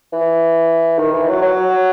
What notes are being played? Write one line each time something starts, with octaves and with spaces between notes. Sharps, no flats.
E3
D#3
E3
F#3
F#3